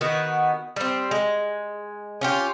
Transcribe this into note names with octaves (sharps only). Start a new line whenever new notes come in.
D#3 B3 F#4
G3 C4
G#3
C#4 F4 G4